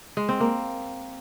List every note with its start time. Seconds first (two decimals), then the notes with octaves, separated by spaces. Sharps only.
0.17 G#3
0.29 C4
0.40 A#3